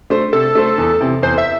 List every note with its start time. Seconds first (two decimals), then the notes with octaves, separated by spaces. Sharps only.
0.10 A3 D4 C5
0.32 C3 A4
0.55 A3 D4 C5
0.78 E2
1.00 C3 E3 C4
1.22 E2 C5
1.38 E5